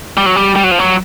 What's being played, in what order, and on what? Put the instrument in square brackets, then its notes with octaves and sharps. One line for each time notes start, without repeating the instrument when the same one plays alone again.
[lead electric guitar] G3
F#3
G3
G3
F#3
F3
F#3